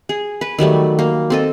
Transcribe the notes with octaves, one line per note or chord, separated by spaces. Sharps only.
G#4
B4
D#3 F#3 G3 A3
A#3
C4 A4 D#5